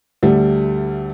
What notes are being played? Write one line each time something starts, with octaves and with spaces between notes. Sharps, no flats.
D2 G3 A3